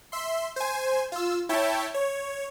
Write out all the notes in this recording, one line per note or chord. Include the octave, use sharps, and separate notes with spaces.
E5 C6
C5 G#5
F4 E6
E4 C#5 E5 G5 A5
C#5